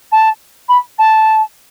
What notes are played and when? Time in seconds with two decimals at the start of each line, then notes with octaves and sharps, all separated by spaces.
0.12 A5
0.69 B5
0.98 A5